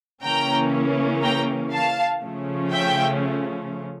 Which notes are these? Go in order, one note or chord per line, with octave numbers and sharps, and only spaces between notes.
C#3 E3 A#3 C#4 G5 A#5
G5 A#5
F5 A5
C#3 F3 A3 C#4
E5 G5